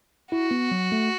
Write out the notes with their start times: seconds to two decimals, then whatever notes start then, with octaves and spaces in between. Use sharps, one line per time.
0.32 E4 F#4
0.51 B3
0.71 F#3
0.92 A3